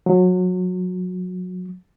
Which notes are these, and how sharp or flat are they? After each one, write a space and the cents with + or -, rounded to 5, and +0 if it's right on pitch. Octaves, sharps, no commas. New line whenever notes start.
F#3 -25